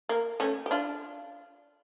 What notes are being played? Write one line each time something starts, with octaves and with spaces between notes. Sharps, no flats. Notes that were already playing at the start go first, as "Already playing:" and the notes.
A#3
A3 C#4
G4
D4 F4